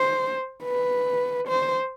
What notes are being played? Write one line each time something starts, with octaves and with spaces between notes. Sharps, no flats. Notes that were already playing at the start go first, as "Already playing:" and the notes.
Already playing: C5
B4
C5